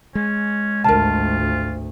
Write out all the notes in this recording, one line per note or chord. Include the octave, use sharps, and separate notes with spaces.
G#3 C#4
G#1 D2 F4 A#4 A5